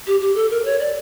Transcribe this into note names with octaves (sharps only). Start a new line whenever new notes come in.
G4
G4
A4
A#4
C#5
D5